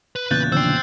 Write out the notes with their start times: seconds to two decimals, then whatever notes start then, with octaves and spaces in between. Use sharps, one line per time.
0.16 B4
0.31 E2 A#2 C#3 F#6 G6 A6
0.52 D3 F3 D4 C5 G5 E6